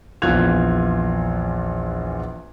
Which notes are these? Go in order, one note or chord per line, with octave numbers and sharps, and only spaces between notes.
A#1 E2 F4 F#6 G#6 F7